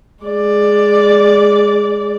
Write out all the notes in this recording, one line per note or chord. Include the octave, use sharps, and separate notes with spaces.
G#3 D5